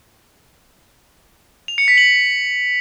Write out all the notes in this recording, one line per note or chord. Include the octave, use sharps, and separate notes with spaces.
F7
C#7
B6
F#7